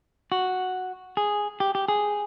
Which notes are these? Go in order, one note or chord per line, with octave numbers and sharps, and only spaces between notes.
F#4
G#4
G4
G4
G#4